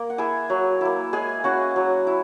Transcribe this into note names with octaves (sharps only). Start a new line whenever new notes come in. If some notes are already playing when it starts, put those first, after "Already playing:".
Already playing: A#3 A#4
F#5
E4 G#4 G#5
F#3
A#3 E4
G#3 G#4 G#5
C#4 E4 F#4 F#5
F#3
E4